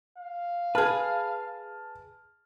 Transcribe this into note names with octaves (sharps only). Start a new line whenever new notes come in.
F5
G#4 B4 A5 F6